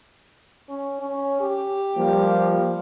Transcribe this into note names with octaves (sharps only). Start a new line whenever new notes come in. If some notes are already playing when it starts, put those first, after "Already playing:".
C#4
C#4
G4
F3 G3 A#3